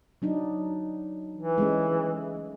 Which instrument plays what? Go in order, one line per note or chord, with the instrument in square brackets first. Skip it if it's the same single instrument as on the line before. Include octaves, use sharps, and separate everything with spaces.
[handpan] F#3 D4 D#4
[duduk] E3
[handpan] G#3 A3 C#4